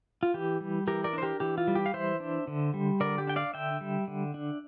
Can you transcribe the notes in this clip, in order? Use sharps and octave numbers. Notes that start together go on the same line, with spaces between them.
F4
E3 G4
G3
E3 G4 A#4
A#4 D5
D4 C5
G4 A#4
E3 G4
F4
G3
G4
F5
E3 C5 E5
D4
D3
G3
D3 A#4 D5
G4
D4 G5
D5 F5
D3 E5 G5
G3
D3
D4